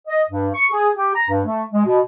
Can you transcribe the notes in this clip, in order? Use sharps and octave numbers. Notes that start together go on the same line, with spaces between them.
D#5
G2
C#6
G#4
G4
A#5
G2
A3
G#3
B2